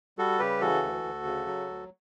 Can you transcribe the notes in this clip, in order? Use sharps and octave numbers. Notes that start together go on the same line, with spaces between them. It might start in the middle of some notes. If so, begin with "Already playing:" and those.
G3 F#4 A4
C#3 G4 B4
E3 F#4 A4
D2
D2
C#3
F#3
D2